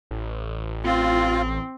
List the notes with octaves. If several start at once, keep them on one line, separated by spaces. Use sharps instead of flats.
A1
C4 F4